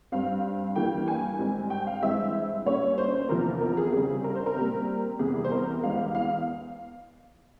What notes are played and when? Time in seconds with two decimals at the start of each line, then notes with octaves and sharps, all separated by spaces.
0.12 G2 G3 C4 F5
0.75 G2 E3 G3 A#3 G5
1.08 G#5
1.39 G#2 G3 C4
1.70 G5
1.87 F5
2.02 G2 E3 G#3 C4 E5
2.65 A#2 G3 C#4 C#5
2.98 C5
3.14 C5
3.29 E2 C3 F3 A#4
3.61 A#4
3.77 G#4
3.92 C#3 G3 C4 G#4
4.24 A#4
4.35 C5
4.46 A#4
4.56 A#2 G3 C4
5.19 E2 C3 G3 G#4
5.44 C5
5.51 A#4
5.83 E2 E3 G#3 F5
6.15 F5